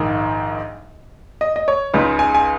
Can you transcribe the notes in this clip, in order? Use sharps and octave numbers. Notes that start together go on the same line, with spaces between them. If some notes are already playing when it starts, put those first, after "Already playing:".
Already playing: A#1 G#2 D#3
D#5
D#5
C#5
C#2 C#3 G#3 D#4
G#5
G#5